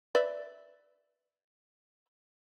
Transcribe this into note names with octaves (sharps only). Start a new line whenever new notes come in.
B4 D5 E5